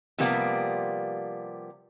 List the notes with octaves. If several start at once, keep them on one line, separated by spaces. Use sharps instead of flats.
C3 F3 G3 A#3 B3 D5